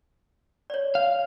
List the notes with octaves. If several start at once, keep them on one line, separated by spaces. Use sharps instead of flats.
C#5 D5
F5